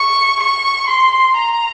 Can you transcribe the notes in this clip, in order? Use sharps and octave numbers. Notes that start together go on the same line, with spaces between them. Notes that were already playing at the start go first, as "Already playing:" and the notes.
Already playing: C#6
C#6
C6
A#5